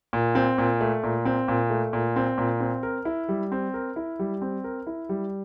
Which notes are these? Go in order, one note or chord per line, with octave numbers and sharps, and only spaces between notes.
A#2
C4
A#2
A3
A#2
C4
A#2
A3
A#2
C4
A#2
C4
A#4
E4
G3
C4
A#4
E4
G3
C4
A#4
E4
G3